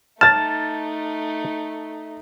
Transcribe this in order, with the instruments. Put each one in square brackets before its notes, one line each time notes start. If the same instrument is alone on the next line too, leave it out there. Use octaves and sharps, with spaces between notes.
[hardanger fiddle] A3 D#4 [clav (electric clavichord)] A5 [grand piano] F6 A6